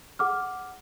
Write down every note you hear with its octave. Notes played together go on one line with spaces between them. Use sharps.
G#4 F#5 D6 F6